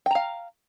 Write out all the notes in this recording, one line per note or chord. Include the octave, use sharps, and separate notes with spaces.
F5 G5 A#5